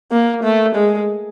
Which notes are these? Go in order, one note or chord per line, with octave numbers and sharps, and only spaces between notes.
A#3
A3
G#3